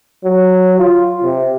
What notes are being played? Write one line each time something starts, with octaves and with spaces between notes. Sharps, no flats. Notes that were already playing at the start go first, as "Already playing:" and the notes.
F#3
F4
C3